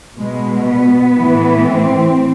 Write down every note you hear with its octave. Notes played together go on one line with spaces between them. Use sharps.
B2 G#3
B3
A2 E3
C4